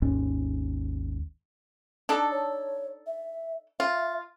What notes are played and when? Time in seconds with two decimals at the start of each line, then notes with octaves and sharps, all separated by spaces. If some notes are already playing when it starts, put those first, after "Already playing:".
0.02 G#1 D#2 G#2 C#4
2.09 D4 D#4 A4
2.32 C#5
3.07 E5
3.80 F4 E5